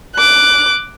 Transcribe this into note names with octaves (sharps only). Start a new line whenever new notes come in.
D6 F#6